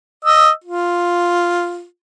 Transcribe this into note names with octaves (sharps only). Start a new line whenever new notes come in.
D#5 E6
F4